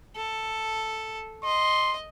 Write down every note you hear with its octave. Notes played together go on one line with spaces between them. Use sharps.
A4
D#5 C6